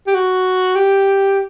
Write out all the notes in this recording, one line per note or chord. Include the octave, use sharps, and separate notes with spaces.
G4
F#4
G4